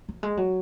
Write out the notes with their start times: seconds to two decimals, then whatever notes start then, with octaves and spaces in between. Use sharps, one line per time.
0.09 F#3
0.23 G#3
0.37 F#3